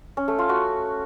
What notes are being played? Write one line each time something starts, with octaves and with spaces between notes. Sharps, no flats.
C#4
A3
F4
F#4